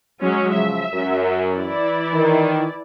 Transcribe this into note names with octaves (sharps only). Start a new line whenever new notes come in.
F#3 G#3 C#4
C#3 F3 E5
F#2
E3 E4 D5
D#3